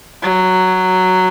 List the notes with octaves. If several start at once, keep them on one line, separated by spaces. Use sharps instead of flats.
F#3